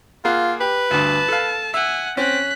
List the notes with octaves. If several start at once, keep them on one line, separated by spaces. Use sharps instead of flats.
A#3 F4 G#4 F#5
G4 B4
D2 G2 A5
A4 F5
E5 F#5 G#5
C4 C#4 F#6 B6